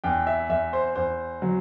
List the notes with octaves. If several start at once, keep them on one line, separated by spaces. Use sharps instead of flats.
E2 G5
E5
E2 E5
C5
E2 C5
F#3